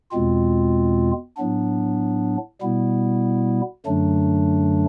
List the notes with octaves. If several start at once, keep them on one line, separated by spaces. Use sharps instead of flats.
E2 B2 G#3 C4 F4
A2 F#3 B3 D4
B2 G3 B3 E4
F#2 D3 F#3 A3 D4